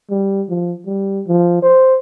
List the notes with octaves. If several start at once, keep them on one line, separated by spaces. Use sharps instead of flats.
G3
F3
G3
F3
C5